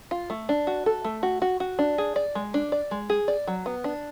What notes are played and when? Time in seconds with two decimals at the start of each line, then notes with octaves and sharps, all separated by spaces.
0.11 F4
0.30 A3
0.49 D4
0.67 F#4
0.86 A4
1.04 A3
1.23 F#4
1.42 F#4
1.60 F#4
1.79 D4
1.98 G#4
2.16 D5
2.35 G#3
2.54 D4
2.72 D5
2.91 G#3
3.10 G#4
3.28 D5
3.47 F#3
3.66 B3
3.84 D4